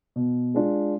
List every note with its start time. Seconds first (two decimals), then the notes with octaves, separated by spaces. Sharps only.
0.16 B2
0.54 G#3 D4 F4